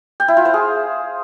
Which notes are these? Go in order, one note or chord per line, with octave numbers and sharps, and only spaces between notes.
G5
E4
F4
C5
G#4